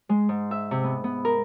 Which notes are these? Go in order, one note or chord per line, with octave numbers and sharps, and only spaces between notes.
G#3
G#2
E5
C3
B3
B3
A#4